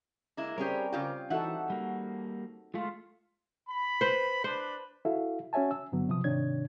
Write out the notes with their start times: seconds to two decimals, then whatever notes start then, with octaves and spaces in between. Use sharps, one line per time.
0.37 G#3 A#3 E4
0.58 G3 C4 C#4 G4 G#4 A#4 C#5
0.93 C#3 F4 G4 G5
1.30 E3 D#4 F#4 A4 E5 F#5
1.70 G3 A#3
2.74 G#3 A3 F4
3.68 B5
4.01 B4 C5
4.44 D4 B4 C5 B5
5.05 E4 F#4 A4 E5 F5
5.53 C#4 F#4 C#5 E5 G#5 A5
5.71 E6
5.92 G2 D3 F#3 B3
6.09 C3 F3 D#6
6.24 G#2 C3 D#3 D4 C#5 G#6